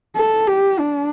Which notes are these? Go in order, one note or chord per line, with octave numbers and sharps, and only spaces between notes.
A4
G4
D4